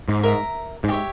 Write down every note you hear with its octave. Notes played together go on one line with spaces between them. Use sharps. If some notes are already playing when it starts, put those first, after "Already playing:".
G#2
A#4 E5 A#5
G#2
G4 C#5 E5